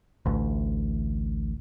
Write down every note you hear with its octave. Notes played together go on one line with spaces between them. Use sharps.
A1 D2